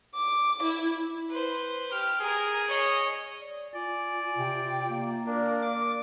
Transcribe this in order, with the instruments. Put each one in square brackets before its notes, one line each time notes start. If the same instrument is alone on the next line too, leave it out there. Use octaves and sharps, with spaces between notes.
[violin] D6
E4
[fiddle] B4 C5
[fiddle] G4 [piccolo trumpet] F6
[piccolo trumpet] G#4 [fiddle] A#4 G#5
[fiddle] C#5 D#5
[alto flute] D5
[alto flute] F4 [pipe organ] D5 [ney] G#5
[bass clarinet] C3 [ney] G5
[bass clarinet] A#3
[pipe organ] D4 [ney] A#4 [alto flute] D5
[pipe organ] D6